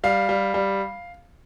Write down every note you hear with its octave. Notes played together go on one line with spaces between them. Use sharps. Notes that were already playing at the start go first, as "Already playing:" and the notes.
G3 F5
G3
G3